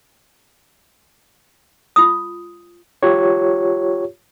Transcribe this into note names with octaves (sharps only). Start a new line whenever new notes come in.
F4 D#6
F4 G4 C#5